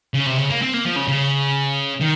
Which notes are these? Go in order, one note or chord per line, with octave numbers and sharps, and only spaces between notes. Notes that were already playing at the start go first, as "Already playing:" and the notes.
C#3
C3
C#3
A#3
C4
A#3
F3
C#3
C#3
D#3